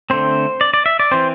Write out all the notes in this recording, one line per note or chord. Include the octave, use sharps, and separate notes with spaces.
D3 A3 C4 C5
D5
D5
E5
D5
E3 C4 C5